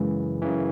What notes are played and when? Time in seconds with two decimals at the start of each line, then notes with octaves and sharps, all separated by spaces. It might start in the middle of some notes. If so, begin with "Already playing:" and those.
Already playing: F#2 C#3 E3 G#3
0.42 F#2 C#3 E3